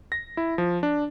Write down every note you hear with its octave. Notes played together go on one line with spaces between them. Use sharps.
A#6
E4
F3
D4